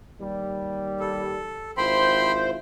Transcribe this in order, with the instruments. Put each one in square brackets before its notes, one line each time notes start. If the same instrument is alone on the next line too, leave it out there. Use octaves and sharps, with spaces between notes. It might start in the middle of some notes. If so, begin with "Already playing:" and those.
[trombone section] D#2 G3
[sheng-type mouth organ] A4
[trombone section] G#1 E4 F4 [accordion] C5 [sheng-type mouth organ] G5 B5 C6